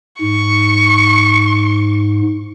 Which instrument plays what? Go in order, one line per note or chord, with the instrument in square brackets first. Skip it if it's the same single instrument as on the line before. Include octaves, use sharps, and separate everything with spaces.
[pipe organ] G#2 [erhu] C#6